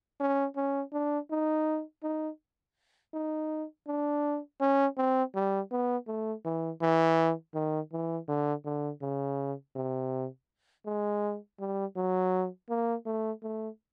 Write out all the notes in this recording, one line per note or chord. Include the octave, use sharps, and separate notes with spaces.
C#4
C#4
D4
D#4
D#4
D#4
D4
C#4
C4
G3
B3
A3
E3
E3
D#3
E3
D3
D3
C#3
C3
G#3
G3
F#3
A#3
A3
A3